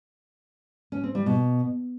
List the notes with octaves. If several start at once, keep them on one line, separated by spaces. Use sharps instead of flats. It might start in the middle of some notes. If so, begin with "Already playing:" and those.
C#4
C4
G3
B2